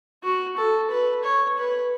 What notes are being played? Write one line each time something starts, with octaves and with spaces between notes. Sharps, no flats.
F#4
A4
B4
C#5
B4